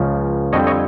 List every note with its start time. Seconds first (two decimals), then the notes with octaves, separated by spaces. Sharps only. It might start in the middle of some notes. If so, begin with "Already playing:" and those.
Already playing: C#2 C#3 F3
0.53 F2 D3 G3 C4 C#5 D#5
0.67 C#5 D#5